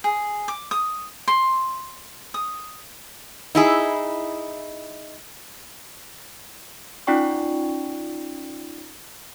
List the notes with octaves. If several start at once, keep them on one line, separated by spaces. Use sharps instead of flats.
G#4
D6
D#6
C6
D#6
D#4 E4 G#4
C#4 D#4 F4 D5 G5 C#6